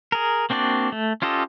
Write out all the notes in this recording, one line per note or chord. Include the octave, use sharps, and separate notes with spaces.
G#4 A#4
A#3 C4 D4 F#4 D5
A3
C#4 F4 G4 A4 D#5